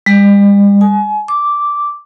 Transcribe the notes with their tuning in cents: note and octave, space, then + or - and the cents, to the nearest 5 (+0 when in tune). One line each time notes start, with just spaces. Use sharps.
G3 +45
G#5 +35
D6 -5